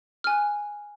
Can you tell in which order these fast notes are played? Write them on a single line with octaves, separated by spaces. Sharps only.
F6 G#5 F#6